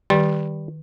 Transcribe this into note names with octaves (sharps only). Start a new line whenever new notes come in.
D#3 G3